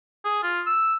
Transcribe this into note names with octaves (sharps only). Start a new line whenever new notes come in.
G#4
F4
E6